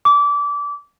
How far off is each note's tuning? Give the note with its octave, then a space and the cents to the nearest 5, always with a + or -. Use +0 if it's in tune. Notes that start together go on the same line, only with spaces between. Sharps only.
D6 -25